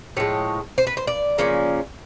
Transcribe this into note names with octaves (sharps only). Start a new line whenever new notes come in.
A2 F3 G#3 C#5
C5
B4
C5
D5
C#3 F3 A#3 C#4